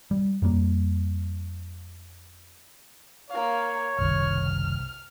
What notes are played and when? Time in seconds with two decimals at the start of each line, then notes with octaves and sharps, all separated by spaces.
0.11 G3
0.42 F2 G3 A#3
3.30 A#3 C#5 F5
3.98 F#1 C2 D#3 F6